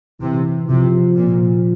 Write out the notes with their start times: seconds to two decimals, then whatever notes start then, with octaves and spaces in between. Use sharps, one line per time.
0.21 C3 E3
0.69 C3 F3
1.16 A#2